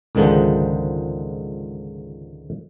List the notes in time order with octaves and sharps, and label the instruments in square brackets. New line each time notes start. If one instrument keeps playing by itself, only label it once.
[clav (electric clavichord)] C#2 G#2 D3 D#3 F3 G#3